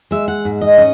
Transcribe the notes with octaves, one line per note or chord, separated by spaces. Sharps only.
G#3 E5
F#5
G#2
D#5
C#4 D#5